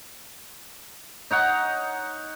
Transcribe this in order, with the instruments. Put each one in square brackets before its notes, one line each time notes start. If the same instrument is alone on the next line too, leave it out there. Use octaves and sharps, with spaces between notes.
[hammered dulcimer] D#4 C#5 F#5